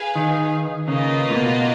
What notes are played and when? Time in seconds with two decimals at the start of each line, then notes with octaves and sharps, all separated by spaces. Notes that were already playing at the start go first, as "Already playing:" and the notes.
Already playing: G#4 B4 F5 G#5
0.16 D#3
0.87 C#3 A#3 F4 B4 D#5
1.30 A#2
1.35 B2